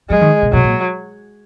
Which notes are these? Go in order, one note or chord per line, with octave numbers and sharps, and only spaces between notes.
F#3 G#3
D#3
B2
B2 F#3
A#2